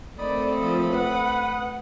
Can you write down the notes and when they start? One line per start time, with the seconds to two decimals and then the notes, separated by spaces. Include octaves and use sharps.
0.19 D#3 A3 C4 A4 D5 B5 D#6
0.58 F3 A#3
0.93 B4 F#5